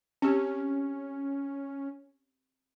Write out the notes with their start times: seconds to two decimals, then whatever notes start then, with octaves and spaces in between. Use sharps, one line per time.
0.22 C4 C#4 G4